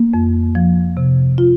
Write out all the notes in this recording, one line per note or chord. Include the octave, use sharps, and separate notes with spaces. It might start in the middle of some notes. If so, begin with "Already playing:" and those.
Already playing: A#3
F2
F3
C3
F4